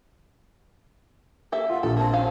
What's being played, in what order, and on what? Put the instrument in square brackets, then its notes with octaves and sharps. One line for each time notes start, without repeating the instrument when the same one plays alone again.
[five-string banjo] A#3 A4 E5 [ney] G4
[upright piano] F4 [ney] F#5
[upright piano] A#1 [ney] G4 [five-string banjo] A4
[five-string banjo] A#3 C4 [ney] A5
[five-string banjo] C#4 C5 F5